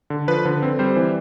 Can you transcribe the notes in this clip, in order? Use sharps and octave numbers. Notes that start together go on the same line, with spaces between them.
D3
F3 B4
D3
C4
G3 C5
E3